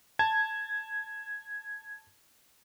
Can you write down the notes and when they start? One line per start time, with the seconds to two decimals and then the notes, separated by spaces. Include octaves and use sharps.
0.19 A5 G#6